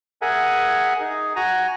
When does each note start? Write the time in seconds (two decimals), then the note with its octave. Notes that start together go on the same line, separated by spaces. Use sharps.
0.22 G#4 A#4 E5 F#5 G#5
1.00 D#4 G#4
1.36 F#4 G#5 A#5